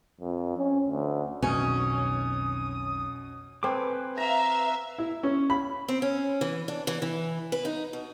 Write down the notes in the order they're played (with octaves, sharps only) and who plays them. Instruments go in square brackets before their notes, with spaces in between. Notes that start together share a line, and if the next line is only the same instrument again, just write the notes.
[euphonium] F2
C#4
D2
[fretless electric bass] B1 F2 D#3 [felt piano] B2 [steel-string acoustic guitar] C#4 [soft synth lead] D#6
[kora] C4 A4 [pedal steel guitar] B4 G#5 D6
[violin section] E5 F5 [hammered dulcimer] A#5
[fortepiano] E4
C#4
B5
[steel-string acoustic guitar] C4
C#4
E3
D4
E3
E3
B4
D#4
B2